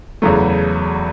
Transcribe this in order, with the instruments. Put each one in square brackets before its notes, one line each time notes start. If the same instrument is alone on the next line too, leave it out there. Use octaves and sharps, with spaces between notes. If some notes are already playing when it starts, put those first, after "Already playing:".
[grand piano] E2 C#3 F#3 A3